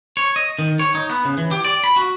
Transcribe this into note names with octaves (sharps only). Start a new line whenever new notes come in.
C#5
D#5
D#3
C#5
D#4
B3
C#3
E3
G4
D5
B5
F#4